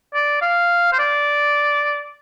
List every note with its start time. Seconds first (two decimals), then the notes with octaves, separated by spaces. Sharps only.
0.14 D5
0.42 F5
0.92 C5
0.99 D5